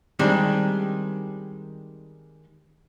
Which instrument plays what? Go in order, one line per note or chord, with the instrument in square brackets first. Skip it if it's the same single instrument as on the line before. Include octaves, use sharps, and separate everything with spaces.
[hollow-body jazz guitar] D#3 G3 G#3 C4 D4